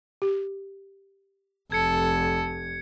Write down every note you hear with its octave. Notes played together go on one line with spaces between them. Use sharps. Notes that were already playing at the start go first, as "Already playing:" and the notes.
G4
F1 A4 G#6 C#7